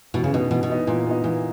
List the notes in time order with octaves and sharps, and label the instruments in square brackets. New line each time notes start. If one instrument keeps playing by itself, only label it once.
[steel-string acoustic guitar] B2 [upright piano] E3
[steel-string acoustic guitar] C#3
[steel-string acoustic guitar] B2 [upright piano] B3 D#4
[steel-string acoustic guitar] B2 [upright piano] E3
[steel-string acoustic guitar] B2
[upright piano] B3 D#4
[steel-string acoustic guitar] A#2 [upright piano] E3
[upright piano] B3 D#4
[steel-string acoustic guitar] A#2 [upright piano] E3